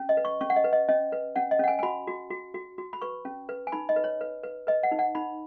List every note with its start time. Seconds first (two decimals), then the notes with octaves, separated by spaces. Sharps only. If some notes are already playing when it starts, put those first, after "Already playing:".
Already playing: C#4
0.09 D#5
0.17 B4
0.25 C#6
0.41 C#4 C#6
0.50 F#5
0.56 D#5
0.64 B4
0.73 D#5
0.89 C#4 D#5
1.12 B4
1.36 C#4 F#5
1.51 D#5
1.59 C#4 F#5
1.68 G#5
1.79 G#5
1.83 F#4 B5
2.07 F#4
2.30 F#4
2.54 F#4
2.78 F#4
2.93 B5
3.02 B4 C#6
3.25 C#4
3.49 B4
3.67 G#5
3.72 D#4 B5
3.89 D#5
3.96 B4
4.04 C#5
4.21 B4
4.43 B4
4.67 B4 D#5
4.83 F#5
4.92 D#4
4.99 F#5
5.15 D#4 B5